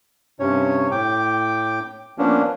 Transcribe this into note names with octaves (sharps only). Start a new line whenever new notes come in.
G2 C3 C#4 C#5
A2 G5 D6
F3 A#3 B3 C#4 D4